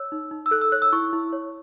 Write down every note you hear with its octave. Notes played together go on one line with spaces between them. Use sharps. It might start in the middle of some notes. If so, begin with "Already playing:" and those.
Already playing: C#5 E6
D#4
D#4
E6
A4 F#6
E6
C#5 F#6
E6
E4 C#6
E4
C#5